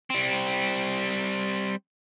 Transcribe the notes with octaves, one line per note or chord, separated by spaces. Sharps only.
G3 C4